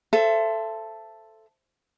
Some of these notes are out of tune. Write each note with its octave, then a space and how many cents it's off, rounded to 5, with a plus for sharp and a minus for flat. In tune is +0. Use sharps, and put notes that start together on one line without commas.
A4 +0 C5 +0 E5 +30